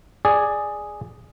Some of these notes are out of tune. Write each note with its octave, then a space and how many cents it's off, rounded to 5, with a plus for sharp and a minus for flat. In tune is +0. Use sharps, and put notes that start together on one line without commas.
G#4 +0 D5 +10